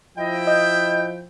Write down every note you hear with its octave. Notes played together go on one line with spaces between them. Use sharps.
F3 E4 D#5 G5
D#5 G6